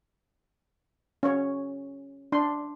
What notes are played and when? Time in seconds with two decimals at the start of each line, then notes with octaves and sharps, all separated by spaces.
1.23 C#4 C#5
2.32 D4 C6